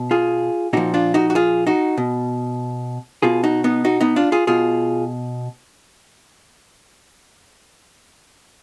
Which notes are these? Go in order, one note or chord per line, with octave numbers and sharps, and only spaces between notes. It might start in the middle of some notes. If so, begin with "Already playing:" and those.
Already playing: B2
F4 G#4
A#2 F3 D#4 F#4
D4 F4
D#4 F#4
F#4
F4 G#4
D#4 F#4
B2
B2 F4 G#4
D#4 F#4
B3 D#4
D#4 F#4
B3 D#4
D4 F4
F4 G#4
B2 F4 G#4